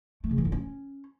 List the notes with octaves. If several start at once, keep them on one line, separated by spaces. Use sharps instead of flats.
A3
C#3
E3
D3
C#4